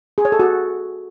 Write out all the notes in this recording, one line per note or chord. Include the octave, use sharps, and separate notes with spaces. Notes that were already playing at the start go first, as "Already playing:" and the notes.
G#4
C#5
A4
F#4